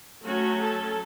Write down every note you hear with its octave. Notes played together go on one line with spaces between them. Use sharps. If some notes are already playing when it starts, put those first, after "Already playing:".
F#3 A3 C#4 F#4
A4